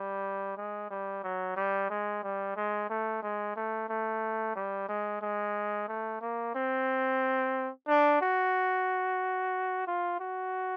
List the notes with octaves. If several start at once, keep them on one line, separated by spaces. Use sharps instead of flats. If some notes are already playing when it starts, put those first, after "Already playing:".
Already playing: G3
G#3
G3
F#3
G3
G#3
G3
G#3
A3
G#3
A3
A3
G3
G#3
G#3
A3
A#3
C4
D4
F#4
F4
F#4